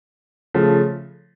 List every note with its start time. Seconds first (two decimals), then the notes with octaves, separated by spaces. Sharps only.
0.54 C#3 F3 A3